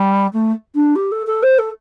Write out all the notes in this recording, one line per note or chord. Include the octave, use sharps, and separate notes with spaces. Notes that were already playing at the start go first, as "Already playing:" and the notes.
Already playing: G3
A3
D4
G4
A4
A4
C5
A4